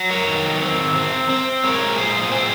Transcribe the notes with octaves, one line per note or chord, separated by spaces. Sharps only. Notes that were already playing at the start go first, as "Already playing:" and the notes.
Already playing: F#3
A#4 C#5
D#3
C4
C4
C4
G#3 A#4 C#5
A#2 G#4 C5
C4 G#4 C5